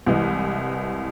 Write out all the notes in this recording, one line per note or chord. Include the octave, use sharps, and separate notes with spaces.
C2 E3 G#3